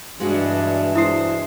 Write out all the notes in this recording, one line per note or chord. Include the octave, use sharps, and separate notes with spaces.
G2 B2 E3 G#3 D4 F#4 G#4
G#3 E4 C5 D#6 C7